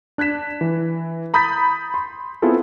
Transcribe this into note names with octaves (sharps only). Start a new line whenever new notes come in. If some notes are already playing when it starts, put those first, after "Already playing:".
D4 F#6 G#6 B6 E7
E3
A#5 B5 D#6 G6 A6 B6
C6
B3 C4 E4 F4 G#4 A4